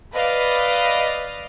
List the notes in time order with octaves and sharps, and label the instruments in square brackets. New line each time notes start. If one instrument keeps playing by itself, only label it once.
[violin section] B4 D5 D#5 F5